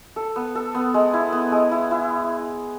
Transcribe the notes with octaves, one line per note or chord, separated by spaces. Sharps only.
A4
B3
A4
B3
G#3
E4
B3
G#3
E4
E4